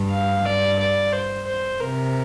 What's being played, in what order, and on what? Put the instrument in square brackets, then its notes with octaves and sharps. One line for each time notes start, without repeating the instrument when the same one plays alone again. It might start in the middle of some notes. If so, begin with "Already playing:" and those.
Already playing: [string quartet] G2
[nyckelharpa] F5
[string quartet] G2 [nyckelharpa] D5
[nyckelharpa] D5
C5
C5
[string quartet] C3 [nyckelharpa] A#4